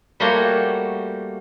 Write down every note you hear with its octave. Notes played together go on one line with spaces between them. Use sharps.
G3 A3 A#3 F#4 C5 C#5